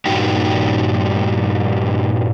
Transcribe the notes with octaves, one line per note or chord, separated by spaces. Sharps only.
G2 A#2 G3 D#4 F#4 G4